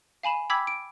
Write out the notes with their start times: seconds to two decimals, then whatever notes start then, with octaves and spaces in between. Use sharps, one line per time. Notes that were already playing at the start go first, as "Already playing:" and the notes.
0.23 F5 G#5 B5 E7
0.50 G5 B5 D6 E6 G#6 B6
0.67 D7